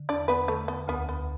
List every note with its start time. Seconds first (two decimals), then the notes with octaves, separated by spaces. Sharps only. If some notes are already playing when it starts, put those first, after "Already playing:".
Already playing: D3
0.09 E2 D4 D5
0.28 B3 B4
0.48 D3 A3
0.68 B3
0.88 D2 B3
1.09 B3